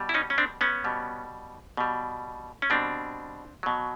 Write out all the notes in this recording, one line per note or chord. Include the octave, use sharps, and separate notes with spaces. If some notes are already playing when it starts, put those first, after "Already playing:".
Already playing: B2 G3
E4
C#4 D#4
C#4
C4 D4
B3 C#4
B2 G3
B2 G3
C#4
B2 G3 C4 D4
B2 F#3